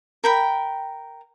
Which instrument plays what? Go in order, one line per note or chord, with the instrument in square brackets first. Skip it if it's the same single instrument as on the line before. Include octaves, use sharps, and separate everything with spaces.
[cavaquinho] A#4 G5 B5